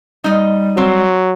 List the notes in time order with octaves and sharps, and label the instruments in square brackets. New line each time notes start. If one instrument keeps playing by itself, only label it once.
[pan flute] G3 [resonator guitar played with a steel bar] D#4 D#5
[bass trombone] F#3 [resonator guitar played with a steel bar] C4 C5